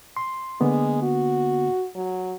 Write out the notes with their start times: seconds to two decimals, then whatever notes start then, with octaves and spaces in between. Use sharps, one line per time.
0.17 C6
0.61 D3 G#3 A#3 B3
1.02 F#4
1.95 F#3